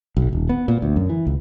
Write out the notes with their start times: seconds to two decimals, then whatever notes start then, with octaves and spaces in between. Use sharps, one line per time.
0.17 B1
0.33 D#1
0.49 B3
0.68 A#2
0.82 D2
0.96 F#2
1.10 E3
1.27 C#2